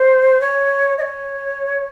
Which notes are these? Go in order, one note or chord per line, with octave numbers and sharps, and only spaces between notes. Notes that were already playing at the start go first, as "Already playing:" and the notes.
Already playing: C5
C#5
D#5
C#5